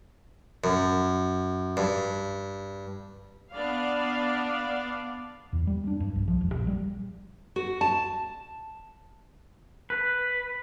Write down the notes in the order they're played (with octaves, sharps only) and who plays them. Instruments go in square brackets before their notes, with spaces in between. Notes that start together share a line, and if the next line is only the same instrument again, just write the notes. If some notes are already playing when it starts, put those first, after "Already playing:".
[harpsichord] F#2
G2
[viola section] B3 D4 D5 F5
[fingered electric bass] E2
G3
D4
G2
B1
F3
E1
A#1
G3
[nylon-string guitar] F#4
A5
[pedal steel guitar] B4